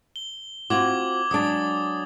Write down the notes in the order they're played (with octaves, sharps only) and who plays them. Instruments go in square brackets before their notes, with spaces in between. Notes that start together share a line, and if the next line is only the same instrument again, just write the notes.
[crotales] G7
[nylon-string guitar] C4 F4 F#4 [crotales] D6 G#6 F#7
[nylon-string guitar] F#3 G#3 D4 [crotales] D#6 A6